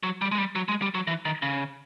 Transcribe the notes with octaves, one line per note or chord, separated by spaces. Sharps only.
F#3
G3
G#3
G3
F#3
G#3
G3
F#3
E3
D#3
C#3